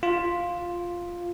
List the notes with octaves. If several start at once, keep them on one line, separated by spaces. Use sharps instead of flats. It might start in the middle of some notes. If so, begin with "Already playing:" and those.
F4